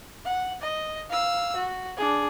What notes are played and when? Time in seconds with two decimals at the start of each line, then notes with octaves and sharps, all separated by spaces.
0.25 F#5
0.61 D#5
1.09 F5 E6
1.56 F#4
1.96 D4 G#4